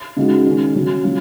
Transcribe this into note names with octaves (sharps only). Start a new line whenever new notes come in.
C#3 G#3 D#4 F#4
D#3 G#3 C#4
C#3 F#3 C#4
F#3 C#4 F4